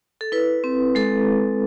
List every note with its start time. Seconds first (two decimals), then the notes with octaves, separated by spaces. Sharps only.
0.21 A4
0.32 E4 B4
0.64 C4
0.95 G#3 A4